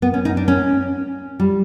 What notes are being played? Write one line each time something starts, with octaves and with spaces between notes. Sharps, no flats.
B3
C#4
D#4
D4
C#4
G3